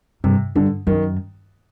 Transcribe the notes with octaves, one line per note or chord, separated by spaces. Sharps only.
G2 C3
G2 D3
F#2 D#3